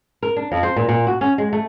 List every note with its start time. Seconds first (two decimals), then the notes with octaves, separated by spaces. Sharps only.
0.22 A#4
0.37 D4
0.52 F2
0.63 C5
0.76 A#2
0.89 A#2
1.07 F#4
1.21 C#4
1.38 G#3
1.53 A3